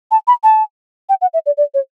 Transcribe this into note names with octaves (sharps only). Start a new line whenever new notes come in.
A5
B5
A5
G5
F#5
E5
D5
D5
C#5